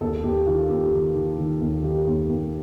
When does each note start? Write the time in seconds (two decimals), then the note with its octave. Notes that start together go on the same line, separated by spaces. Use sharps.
0.01 D#2 A4
0.24 D#2 G4
0.46 D#3 F4
0.69 D#2 G4
0.93 D#3
1.15 D#3
1.38 D#3
1.61 D#2
1.83 D#3 G4
2.07 D#2
2.29 D#2